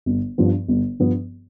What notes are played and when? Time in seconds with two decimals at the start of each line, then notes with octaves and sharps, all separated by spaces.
0.06 G1
0.38 G2 F3 B3
0.68 G1
1.00 G2 F3 B3